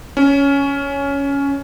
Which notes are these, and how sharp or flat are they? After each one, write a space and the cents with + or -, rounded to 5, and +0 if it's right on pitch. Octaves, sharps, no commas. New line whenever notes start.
C#4 +10